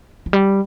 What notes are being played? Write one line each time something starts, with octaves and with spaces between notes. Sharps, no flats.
F3
G3